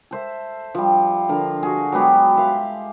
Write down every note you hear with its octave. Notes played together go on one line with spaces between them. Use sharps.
A4 C5 E5
F3 G3
D3 F3 A#4
F#4 G#4
F#3 G#3 B3 G4
E5 F5 C6